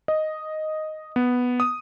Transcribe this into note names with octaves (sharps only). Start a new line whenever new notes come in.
D#5
B3
D#6